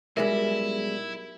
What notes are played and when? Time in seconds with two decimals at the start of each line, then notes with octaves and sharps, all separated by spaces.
0.17 B1 G3 G#3 E4 A#4 E5